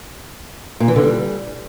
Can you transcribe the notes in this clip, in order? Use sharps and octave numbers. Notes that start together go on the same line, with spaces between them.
A#2
E3
D3
G3